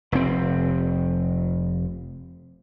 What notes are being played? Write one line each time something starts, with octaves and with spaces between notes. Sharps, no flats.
F1 A2 C4